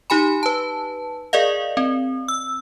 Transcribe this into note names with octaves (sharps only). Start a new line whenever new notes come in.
D#4 G4 G#5 B5
B4 A5
G#4 A#4 D5 D#5 F5
C4
E6